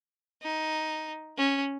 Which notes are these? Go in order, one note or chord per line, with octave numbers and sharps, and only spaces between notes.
D#4
C#4